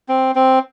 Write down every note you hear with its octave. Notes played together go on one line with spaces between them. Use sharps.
C4
C4